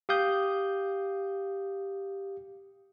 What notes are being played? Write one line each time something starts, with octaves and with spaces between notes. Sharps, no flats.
G4 F5 D#6 G6